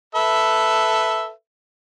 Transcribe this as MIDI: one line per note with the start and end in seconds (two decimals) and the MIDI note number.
0.15 1.31 69
0.15 1.31 71
0.15 1.31 76